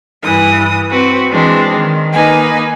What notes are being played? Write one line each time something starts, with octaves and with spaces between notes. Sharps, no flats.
G2 E3 D#6
C4 F#4 B4
E3 G#3 C4 D4
D#3
A#3 D#4 B4 G#5